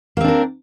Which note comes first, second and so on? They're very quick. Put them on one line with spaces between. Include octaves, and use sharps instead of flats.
A#3 C4 D4 A#4